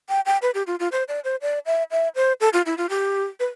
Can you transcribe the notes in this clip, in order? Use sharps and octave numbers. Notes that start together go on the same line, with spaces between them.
G5
G5
B4
G4
F4
F4
C5
D5
C5
D5
E5
E5
C5
A4
F4
E4
F4
G4
B4